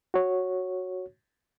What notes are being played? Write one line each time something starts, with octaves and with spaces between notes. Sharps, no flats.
F#4 C#5